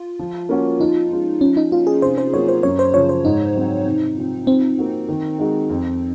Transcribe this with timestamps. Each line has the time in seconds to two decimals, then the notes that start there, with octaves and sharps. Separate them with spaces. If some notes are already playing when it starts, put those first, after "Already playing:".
Already playing: F4
0.19 F3
0.49 A#3 C#4 F#4
0.80 F3 D#4
1.11 G#3 C#4 F4
1.41 F3 C#4
1.57 D#4
1.72 A#3 C#4 F4 F#4
1.87 G#4
2.02 C3 C5
2.18 C5
2.33 F#3 A#3 C#5
2.48 C5
2.63 F#2 C#5
2.79 C5
2.94 C#3 F3 C#5
3.09 C5
3.25 G#2 D#4
3.55 F#3 C4
3.85 C3
4.17 F3 C4
4.47 F3 C4
4.78 A#3 D#4 F#4
5.09 D#3
5.38 G#3 D#4 F#4
5.70 F2